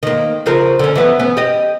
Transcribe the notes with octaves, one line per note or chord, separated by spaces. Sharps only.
D#3 A#3
C#3 F3 A#4
D3 C#4
E3 F#3 B3
B3 C#4
G4 D#5